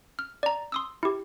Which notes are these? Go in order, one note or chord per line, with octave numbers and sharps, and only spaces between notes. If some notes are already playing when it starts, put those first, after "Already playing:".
F6
D5 A#5
C6 D#6 E6
E4 G4